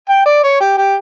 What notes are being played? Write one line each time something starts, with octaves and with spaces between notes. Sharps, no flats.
G5
D5
C#5
G4
G4